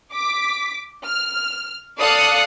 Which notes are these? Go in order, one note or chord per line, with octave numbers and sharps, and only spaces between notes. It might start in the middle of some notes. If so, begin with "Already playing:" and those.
D6 B6
F6
A4 D5 F5 D#6 F#6 C#7